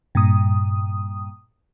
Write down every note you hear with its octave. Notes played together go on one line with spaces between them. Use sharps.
G2 A#2 D#6